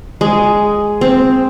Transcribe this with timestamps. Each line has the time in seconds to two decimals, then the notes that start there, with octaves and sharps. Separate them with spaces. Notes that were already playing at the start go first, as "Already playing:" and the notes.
0.21 G#3 G#4
1.01 C4